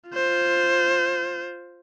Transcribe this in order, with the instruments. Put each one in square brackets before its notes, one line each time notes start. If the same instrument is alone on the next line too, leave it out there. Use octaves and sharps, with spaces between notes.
[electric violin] F4 C5